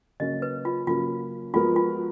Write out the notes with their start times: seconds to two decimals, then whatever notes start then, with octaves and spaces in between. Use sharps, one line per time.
0.20 C#3 F#3 A#3 C#4 D#5
0.42 B4
0.65 F4
0.87 C#3 F#3 A#3 C#4 F4
1.53 F3 G#3 B3 F4 F#4 A#4
1.76 F4